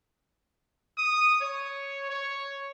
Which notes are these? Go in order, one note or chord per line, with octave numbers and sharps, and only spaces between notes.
D#6
C#5
C#5